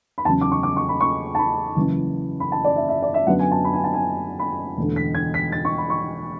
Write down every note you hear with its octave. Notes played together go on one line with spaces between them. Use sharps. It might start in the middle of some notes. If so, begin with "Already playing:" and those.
B5
E2 C#3 F#3 A5
D6
C#6
D6
C#6
B5
C#6
A5
B5
F#1 F#2 E3
B5
A5
D5
E5
E5
D5
E5
F#2 D3 F#3 B3 F#5
G#5
A5
B5
G#5
A5
G#5
B5
E1 E2 D3 A3
B6
G#6
B6
A6
C#6
B5
C#6